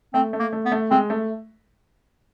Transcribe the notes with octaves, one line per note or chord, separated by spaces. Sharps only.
A3 C4
A3
A#3
A3
B3
A3
G#3 C4
A3